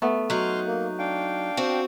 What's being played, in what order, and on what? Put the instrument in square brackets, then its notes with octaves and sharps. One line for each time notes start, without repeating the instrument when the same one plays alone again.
[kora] A3 B3
[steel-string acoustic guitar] F#3 D#4 [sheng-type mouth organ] C6 F6
[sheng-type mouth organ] A#3
D4 F5 G5
[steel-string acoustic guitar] C4 F#4